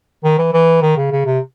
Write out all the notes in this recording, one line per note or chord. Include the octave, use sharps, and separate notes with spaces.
D#3
E3
E3
D#3
C#3
C#3
C3